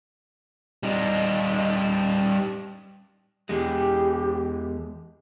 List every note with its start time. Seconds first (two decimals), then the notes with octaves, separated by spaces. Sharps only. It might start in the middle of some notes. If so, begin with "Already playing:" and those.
0.83 G3 D#4
3.49 E2 G#3 G4